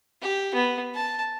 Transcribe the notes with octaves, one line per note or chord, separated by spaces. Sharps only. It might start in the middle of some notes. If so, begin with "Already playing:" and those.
G4
B3
A5